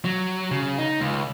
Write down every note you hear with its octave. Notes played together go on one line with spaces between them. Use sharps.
F#3
C#3
D#4
C#2